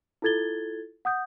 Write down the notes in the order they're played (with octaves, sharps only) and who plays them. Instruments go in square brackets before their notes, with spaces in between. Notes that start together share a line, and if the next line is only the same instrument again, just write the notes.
[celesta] E4 F4 A4 G#6 A6 G7
F#5 D#6 G6